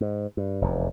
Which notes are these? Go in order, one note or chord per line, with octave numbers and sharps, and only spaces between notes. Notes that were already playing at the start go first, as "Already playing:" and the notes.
G#2
G2
F1 E2